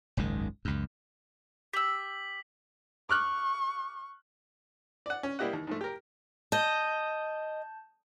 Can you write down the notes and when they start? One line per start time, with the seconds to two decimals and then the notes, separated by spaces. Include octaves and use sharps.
0.17 F#1 C#2 G#2 D#3
0.65 C#2 F#2
1.73 G4 E6 B6 F#7
3.10 C#6 D6 F6 F#6
5.06 D5 F#5
5.23 C#4
5.39 G3 A#3 E4 G4 D#5 F#5
5.53 D#2
5.67 G#2 F3 A3
5.81 G4 A#4
6.52 D#5 A5 G6